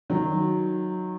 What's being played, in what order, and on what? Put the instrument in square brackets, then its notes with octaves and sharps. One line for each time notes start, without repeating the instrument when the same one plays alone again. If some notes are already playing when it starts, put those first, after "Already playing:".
[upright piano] D#3 F#3